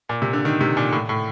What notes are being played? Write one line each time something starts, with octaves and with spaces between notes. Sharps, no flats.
A#2
C3
D3
D#3
C3
A#2
A2
A2